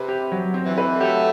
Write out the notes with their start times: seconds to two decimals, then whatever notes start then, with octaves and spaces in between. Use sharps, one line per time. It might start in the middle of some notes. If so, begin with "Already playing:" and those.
Already playing: C3 B4
0.08 G4
0.32 F#3
0.54 C4
0.65 E3
0.78 B4
1.00 F#3 A3 G4